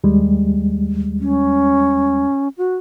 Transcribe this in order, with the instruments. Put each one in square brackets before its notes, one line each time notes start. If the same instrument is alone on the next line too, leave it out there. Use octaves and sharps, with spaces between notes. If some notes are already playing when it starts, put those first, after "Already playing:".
[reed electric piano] D#2 G3 G#3
[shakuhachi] C#4
F#4